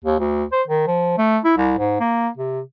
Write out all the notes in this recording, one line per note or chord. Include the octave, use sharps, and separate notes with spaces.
D#2
D2
C5
D#3
F3
A3
E4
C2
G#2
A#3
C3